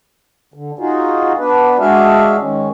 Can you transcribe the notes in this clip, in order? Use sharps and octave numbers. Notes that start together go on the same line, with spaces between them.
D3
D#4 F4 F#4 G#4
B3 D4 B4
G#3 D4 F#4 G#4 E5 F5
D#3 G#3 C#4